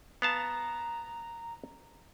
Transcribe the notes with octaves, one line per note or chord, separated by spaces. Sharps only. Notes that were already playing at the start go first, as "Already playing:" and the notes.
B3 F5 A5 A#5